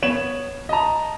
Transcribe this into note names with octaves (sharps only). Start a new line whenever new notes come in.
B3 C#5 E7 F#7
D#5 A5 A#5